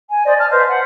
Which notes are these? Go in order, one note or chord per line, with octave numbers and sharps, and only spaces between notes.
G#5
C5 D5 D#5
A5 F6
B4 C5 D#5 F5
F#5